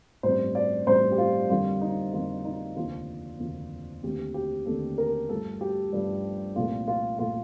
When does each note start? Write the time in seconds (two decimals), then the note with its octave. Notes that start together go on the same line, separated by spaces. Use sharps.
0.23 A1 G2 F3 C4 C5
0.55 D5
0.87 A1 G2 F3 C4 C5
1.12 G4
1.18 F4
1.50 F2 D3 G3 A#3 F4
1.81 D#4
2.13 F2 D3 G3 A#3 F4
2.45 D#4
2.76 F1 D#2 D3 F3 F4
3.40 F1 D#2 D3 F3
4.03 D#2 D3 A3 C4 G4
4.34 G4
4.66 D#2 D3 A3 C4 A4
4.98 A#4
5.29 G2 F3 A3 A4
5.61 G4
5.92 G2 F3 A3
6.56 C2 A#2 F3 A3 F4
6.88 F4
7.19 A#2 F3 A3 F4